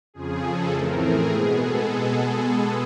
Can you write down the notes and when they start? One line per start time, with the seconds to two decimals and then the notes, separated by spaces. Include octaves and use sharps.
0.14 F2 C#3 F3 G#4
0.43 A4
0.71 A2 E3 A3 C4 A#4
1.00 G#4
1.29 B2 G#3 B3
1.59 A4